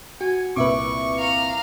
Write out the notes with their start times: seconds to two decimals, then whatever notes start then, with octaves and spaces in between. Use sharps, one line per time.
0.21 F#4 G#5
0.56 C2 A#2 B4 E5 C#6 D6
1.19 F5 A#5